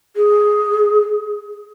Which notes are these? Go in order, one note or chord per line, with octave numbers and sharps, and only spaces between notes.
G#4